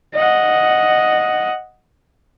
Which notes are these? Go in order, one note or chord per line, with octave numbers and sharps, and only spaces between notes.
D#5 F#5